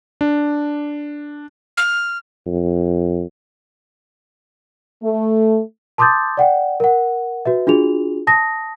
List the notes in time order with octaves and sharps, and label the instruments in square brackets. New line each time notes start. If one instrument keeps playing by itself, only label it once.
[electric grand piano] D4
[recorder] F6
[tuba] F2
[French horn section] A3
[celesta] A5 C6 D6 D#6 G6 A6
D5 F#5 G5
A#4 F#5
F#4 B4 E5
D4 F4 F#4 G#4 F7
A5 D#6 A#6